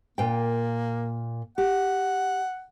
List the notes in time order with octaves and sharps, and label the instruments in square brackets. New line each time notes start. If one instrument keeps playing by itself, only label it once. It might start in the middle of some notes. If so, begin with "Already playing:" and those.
[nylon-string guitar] A#2 G5 [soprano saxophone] A#3
[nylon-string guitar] G4 [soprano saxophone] F#5